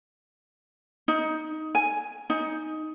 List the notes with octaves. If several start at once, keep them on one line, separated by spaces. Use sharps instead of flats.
D#4
G#5
D#4